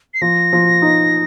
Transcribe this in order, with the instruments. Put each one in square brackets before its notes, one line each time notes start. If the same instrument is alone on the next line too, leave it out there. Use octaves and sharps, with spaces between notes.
[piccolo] C7
[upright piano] F3 [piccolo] A#6
[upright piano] F3
D#4